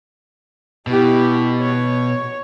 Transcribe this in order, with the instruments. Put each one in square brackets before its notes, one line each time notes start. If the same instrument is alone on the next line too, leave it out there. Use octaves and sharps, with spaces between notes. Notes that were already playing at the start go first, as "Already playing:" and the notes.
[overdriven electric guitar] B2 [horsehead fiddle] E4 G4
[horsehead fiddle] C#5